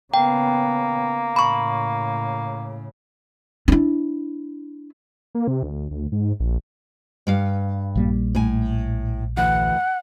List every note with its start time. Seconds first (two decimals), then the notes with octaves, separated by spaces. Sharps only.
0.14 C#3 A#3 B3 G5
1.36 A2 C#3 B5 C#6
3.68 D4 E4
5.35 A#3
5.48 C3
5.63 D2
5.91 D2
6.12 G#2
6.40 A#1
7.27 G2 F5
7.96 A#1 G3 A#3
8.35 A2 G#5
9.37 D2 E3 F#5